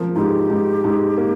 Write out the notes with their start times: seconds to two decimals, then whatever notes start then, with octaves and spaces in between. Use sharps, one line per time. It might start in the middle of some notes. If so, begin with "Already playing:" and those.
Already playing: F3 A#3
0.16 G#2 G4
0.50 G#2
0.84 G#2
1.18 A#3